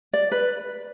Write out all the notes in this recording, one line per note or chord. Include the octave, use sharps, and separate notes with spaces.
D5
B4